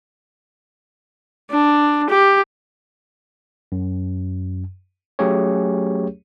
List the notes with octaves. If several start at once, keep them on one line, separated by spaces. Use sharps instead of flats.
D4
G4
F#2
F#3 A3 C#4 G4 G#4 C#5